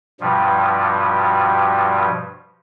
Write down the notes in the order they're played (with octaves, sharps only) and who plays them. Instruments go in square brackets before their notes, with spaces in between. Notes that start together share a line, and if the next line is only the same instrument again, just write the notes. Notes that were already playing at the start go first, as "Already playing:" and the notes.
[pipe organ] G2 B2 F3 G3